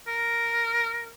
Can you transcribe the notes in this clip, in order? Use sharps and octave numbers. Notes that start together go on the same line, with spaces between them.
A#4